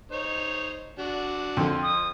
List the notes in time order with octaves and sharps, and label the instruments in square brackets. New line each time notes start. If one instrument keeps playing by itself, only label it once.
[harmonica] D#4 C5 C#5
D4 F#4
[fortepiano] F2 D3
[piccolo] D#6